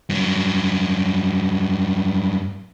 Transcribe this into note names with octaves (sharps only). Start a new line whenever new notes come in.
G2 F#3